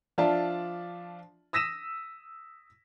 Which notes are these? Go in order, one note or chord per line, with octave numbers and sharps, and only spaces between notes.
F3 D4 F4 D5 E5 A5
D#6 E6 A#6 B6 D#7 E7